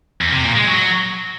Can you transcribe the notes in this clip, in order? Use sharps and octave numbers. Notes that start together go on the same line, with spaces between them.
E2
C3
A#2
G#3
F#3